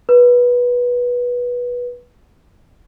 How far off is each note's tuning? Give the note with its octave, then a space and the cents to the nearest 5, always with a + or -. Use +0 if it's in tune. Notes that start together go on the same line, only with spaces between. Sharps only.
B4 -15